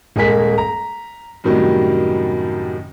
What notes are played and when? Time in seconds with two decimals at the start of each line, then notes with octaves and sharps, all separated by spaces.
0.16 D#1 G#3 G#4 A#4 B6
0.58 A#5
1.44 F#2 A2 C3 D#3 F#3 G3